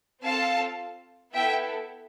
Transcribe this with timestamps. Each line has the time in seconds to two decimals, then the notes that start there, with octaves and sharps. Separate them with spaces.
0.23 C4 F4 A4 F5 A5
1.33 B3 E4 A4 E5 G5